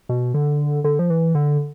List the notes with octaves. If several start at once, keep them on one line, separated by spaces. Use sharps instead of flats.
B2
D3
D3
F3
E3
D3